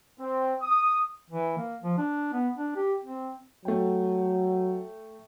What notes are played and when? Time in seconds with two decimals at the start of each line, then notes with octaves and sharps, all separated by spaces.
0.19 C4
0.62 D#6
1.30 E3
1.58 A#3
1.83 F3
1.98 D4
2.33 B3
2.58 D4
2.76 G4
3.04 C4
3.65 F#3 A3 G5